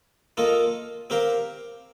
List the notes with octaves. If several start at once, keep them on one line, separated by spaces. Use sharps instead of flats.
A#3 F4 A4 D#5
C4 G4 A#4 F5